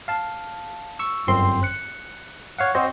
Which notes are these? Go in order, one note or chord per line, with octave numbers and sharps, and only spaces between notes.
F5 A5
C#6 E6
G1 F#2 C4 C6
F#6 C#7
C#5 F5 F#5
C4 F#4 C5 D#5